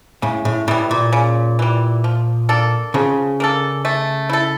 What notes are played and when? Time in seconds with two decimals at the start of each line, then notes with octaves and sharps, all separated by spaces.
0.22 A2 C#3
0.45 A2
0.68 A2 E3 G3
0.91 A#2
1.13 C#3
1.59 E3 G3
2.04 F3
2.49 A#3 D4 A4
2.94 C#3 F3
3.40 A#3 D4 A4
3.85 A3
4.30 E4 A4